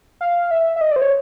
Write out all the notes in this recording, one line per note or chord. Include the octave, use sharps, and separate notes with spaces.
F5
E5
E5
D#5
D5
C5
C#5